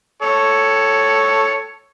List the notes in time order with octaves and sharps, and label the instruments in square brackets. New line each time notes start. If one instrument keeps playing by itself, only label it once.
[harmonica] A4 C#5